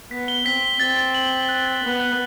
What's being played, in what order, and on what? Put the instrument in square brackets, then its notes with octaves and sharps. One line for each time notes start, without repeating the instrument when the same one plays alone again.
[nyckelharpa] B3 [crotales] B6
[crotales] G7
[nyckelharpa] C4 [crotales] B6
[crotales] G7
[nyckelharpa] C4 [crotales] A6
[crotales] A6
F#7
F#7
F#6
A6
[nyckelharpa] B3 [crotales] F#6
[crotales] F#6